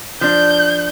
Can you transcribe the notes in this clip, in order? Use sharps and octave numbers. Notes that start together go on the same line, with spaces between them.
F3 D4 G6